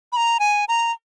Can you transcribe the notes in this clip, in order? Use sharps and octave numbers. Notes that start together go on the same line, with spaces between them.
B5
A#5
G#5
A#5